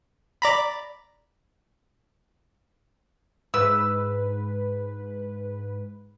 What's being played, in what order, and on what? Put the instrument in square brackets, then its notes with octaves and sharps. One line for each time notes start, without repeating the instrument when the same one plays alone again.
[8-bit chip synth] D5 A#5 B5
[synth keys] G#2 B4 [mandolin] E6